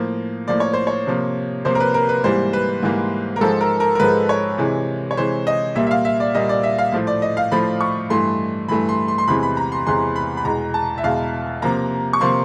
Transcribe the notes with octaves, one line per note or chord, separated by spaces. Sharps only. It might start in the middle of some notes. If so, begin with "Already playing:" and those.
Already playing: A2 F3 A#3
A2 F3 A#3 D5
C#5
C5
C#5
C3 F3 A#3
C3 F3 A#3 C5
A#4
B4
A#4
B4
G#2 E3 G3 A#3 C5
B4
G#2 E3 G3 A#3
A#4
G#2 F3 G#3 A4
A#4
A#4
A#4
G#2 F3 G#3 B4
C#5
C3 E3 G#3
C#5
C3 E3 G#3 C5
D#5
A#2 G3 A#3 E5
E5
F5
E5
D5
A#2 G3 A#3 D#5
D5
E5
F5
A2 F3 A3
D5
D#5
F5
A2 F3 A3 B5
C#6
G2 E3 A3 C6
G2 E3 A3 B5
C6
C6
C6
E2 C3 E3 G#3 B5
B5
A#5
C6
E2 C3 E3 G#3 C6
B5
B5
E2 B2 G#3 A#5
A5
E5
E2 B2 G#3 F5
C3 F3 A#3 A#5
C#6
C3 F3 A#3 C6